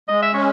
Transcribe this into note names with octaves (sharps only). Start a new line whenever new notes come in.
G#3 D#5
E5
C#4 C#5